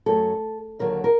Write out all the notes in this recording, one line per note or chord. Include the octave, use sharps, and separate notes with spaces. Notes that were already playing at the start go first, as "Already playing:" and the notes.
F#2 F#3 A3 A4
D#2 D3 F#3 A#4
A#4